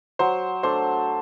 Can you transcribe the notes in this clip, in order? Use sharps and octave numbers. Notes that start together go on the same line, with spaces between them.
F#3 C5
A3 D4 C5